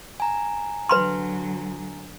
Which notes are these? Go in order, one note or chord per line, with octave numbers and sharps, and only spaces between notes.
G#5 A#5
D3 F#3 B4 B5 C6